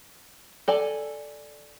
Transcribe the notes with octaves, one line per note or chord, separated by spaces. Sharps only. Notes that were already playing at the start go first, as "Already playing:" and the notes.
A4 D5 G#5